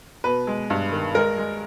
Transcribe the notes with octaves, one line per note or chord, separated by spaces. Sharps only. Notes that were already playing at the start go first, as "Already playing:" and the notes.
B2 B4
G#3
G2
D#3
G#3 A#4
G#3